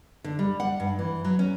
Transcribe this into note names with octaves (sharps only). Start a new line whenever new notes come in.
D3
G3
F#5
G2
E3
F#3
C#4